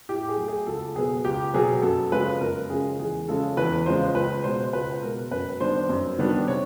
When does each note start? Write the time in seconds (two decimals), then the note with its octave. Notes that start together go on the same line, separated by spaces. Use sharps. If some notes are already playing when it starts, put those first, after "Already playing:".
0.09 A2 G4
0.29 G#4
0.38 F#3 A3
0.48 G#4
0.67 C#2 A4
0.96 B2 F#3 B3 G#4
1.25 C#2 G4
1.54 B2 F#3 B3 G#4
1.82 F#2 A4
2.12 C#3 F3 G#3 C#4 B4
2.41 F#2 A#4
2.70 C#3 F3 G#3 C#4 G#4
2.99 E2 G#4
3.28 C#3 F3 G#3 C#4 A4
3.57 E2 B4
3.86 C#3 F3 G#3 C#4 C5
4.15 C#2 B4
4.44 B2 G#3 C5
4.73 C#2 B4
5.02 B2 G#3 A#4
5.31 F#2 B4
5.60 D#3 G3 B3 D4 C5
5.89 F#2
6.18 D#3 G3 B3 D4
6.47 C3 C#5